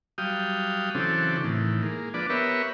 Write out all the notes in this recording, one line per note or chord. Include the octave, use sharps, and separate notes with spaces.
F#3 G3 F5 G5 D#6
C#3 E3 F#3 C4 D4 A4
A2 D#3 E3
G#3 A#3
F3 D4 B4 D5
B3 G4 A#4 B4 C#5 E5